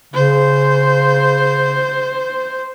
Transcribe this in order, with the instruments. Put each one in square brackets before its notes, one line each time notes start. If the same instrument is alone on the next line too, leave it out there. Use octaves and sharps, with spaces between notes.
[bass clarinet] C#3 [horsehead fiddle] C5